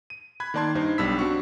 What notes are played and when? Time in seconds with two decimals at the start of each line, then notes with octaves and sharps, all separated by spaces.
0.10 D#7
0.40 B5 F#6 G#6
0.54 D#3 A#3 D5 A5 C6 G#6
0.75 G2 D#4 C5
0.98 B1 G3 D4 B5 E6 B6
1.19 C4 D4 F#4 C#6